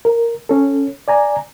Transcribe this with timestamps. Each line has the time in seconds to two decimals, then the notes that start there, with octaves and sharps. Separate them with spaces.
0.05 A#4
0.49 C#4 A4
1.08 D5 G#5 A#5